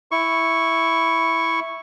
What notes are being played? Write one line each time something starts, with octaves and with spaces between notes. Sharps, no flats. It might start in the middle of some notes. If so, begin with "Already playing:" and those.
E4 C#6